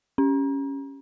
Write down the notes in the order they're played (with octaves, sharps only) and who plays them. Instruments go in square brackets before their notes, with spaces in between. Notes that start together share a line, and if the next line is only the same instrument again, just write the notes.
[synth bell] C#4